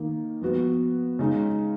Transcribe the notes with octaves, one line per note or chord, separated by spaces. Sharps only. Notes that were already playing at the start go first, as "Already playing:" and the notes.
Already playing: D#3 A#3 D#4
F3 B3 F#4
C#3 G#3 D#4